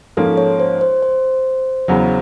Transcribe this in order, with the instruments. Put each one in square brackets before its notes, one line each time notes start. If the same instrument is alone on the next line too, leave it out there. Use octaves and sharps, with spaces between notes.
[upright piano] G#2 F3 A#3 C#4 [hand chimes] A4
[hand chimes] C#5
C5
C5
C5
[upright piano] E2 C#3 F#3